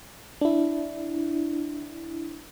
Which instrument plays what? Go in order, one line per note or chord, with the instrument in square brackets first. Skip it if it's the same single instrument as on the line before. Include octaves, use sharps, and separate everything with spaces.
[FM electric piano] D4 E4